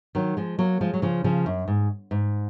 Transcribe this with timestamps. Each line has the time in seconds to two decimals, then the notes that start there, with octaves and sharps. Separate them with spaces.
0.15 D#3 F#3
0.37 F3 G#3
0.59 F#3 A#3
0.81 F3 G#3
0.94 F#3
1.02 C#3 F3
1.24 C#3 F3
1.46 F#2
1.68 G#2
2.11 G#2